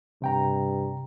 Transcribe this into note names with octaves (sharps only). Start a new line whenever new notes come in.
G2 C3 G5 A#5